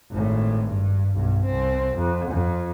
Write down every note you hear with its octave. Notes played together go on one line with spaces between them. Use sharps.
G#1 A2
G2
B1 G2
C2 C4
F2
F2